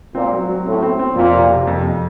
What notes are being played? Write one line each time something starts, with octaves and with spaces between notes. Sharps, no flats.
A#2 C4
F#3
F#3
A2 C4
C4
C4
F2 A#2
C3
C3
F2
F2